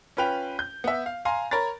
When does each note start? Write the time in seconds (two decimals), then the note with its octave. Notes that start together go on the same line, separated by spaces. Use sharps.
0.17 C#4 F4 B4 G5 F7
0.59 G6
0.84 B3 E5
1.06 F5
1.25 F5 G#5 A#5 C6
1.51 A#4 C#5 A#5 B5 A6